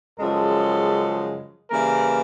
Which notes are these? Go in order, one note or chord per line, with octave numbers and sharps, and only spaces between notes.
F#2 C#3 F3 G#3 A4
C#3 E3 G3 A#3 A#4